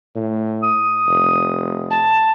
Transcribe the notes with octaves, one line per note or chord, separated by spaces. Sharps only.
A2
D#6
F1
A5